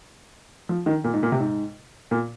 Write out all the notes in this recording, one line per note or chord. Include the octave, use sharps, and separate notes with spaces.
F3
D#3
A#2
G#2
A#2
C3
G#2
A#2